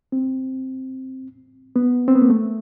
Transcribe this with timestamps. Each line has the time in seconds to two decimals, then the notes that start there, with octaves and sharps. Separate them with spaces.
0.12 C4
1.76 B3
2.08 C4
2.15 B3
2.22 A#3
2.30 A3